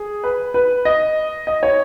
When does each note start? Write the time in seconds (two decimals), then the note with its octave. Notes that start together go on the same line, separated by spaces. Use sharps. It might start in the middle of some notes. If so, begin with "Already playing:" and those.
Already playing: G#4
0.24 B4
0.54 B4
0.85 D#5
1.47 D#5
1.63 C#5